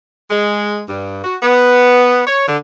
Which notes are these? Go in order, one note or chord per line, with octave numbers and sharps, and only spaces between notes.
G#3
G2
F#4
B3
C#5
D3